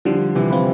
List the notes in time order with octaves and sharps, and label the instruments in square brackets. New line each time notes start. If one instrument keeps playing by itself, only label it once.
[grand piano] D3 F3 [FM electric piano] G3
[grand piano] C3 E3
[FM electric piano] C4 F4 B4